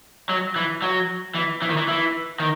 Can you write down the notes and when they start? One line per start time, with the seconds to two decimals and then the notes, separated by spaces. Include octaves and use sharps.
0.30 F#3
0.56 E3
0.82 F#3
1.35 E3
1.62 E3
1.70 D#3
1.77 E3
1.88 E3
2.40 D#3